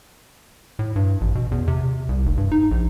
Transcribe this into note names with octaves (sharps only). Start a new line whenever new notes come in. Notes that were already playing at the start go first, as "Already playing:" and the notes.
A2
G2
A1
B2
E2
C3
C2
F1
G2
D#4
A#1